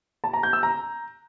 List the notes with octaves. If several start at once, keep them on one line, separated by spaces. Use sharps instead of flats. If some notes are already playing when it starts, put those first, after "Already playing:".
A5
A#5
G6
E6
A#5